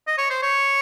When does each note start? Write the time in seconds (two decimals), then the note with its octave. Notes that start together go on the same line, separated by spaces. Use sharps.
0.07 D#5
0.18 C#5
0.30 C5
0.42 C#5